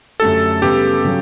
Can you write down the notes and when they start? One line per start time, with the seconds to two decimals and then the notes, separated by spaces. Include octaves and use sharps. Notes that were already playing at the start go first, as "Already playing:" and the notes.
0.20 F#2 D3 A3 D4 G4 A4
0.62 C#3 G3 B3 G4
1.05 C#3 F#3